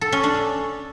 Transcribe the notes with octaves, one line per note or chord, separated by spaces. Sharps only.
A4
C#4
D4